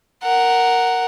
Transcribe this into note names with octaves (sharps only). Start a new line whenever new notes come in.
A#4 F#5